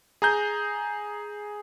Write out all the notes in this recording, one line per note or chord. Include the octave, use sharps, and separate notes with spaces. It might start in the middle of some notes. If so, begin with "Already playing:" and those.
G#4 A#5 G6